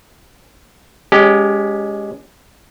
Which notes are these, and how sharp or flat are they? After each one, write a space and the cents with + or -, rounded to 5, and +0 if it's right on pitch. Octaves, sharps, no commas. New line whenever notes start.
G#3 -10 C#4 +20 G4 +0